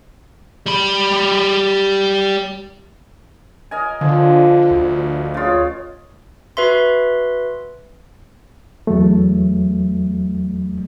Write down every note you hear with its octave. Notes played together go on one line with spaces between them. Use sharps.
G3 B5
A#4 D#5 G#5
D3 F3
D2
C#3 F4
F#4 B4 E5 C6
E2 F#3 A3